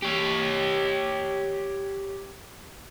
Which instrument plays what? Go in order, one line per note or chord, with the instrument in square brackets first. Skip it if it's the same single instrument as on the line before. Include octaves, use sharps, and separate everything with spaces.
[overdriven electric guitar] G4 C#5